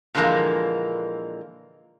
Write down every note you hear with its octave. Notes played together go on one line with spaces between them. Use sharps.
A#2 D3 E3 F3 G#3 A#3